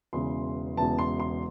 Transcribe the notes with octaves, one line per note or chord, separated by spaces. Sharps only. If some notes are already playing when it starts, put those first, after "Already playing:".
E1 E2 C#3 E3 C6
E1 E2 C#3 E3 A5
C6
C6